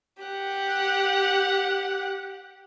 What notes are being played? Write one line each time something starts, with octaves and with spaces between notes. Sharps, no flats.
G4 F#5